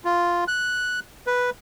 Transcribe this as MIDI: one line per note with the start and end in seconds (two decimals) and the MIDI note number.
0.05 0.44 65
0.48 1.00 90
1.27 1.50 71